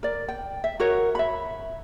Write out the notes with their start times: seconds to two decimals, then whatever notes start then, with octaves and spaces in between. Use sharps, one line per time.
0.03 A#4 D5
0.28 G5
0.64 E5
0.80 F#4 A#4 C#5
1.15 E5 B5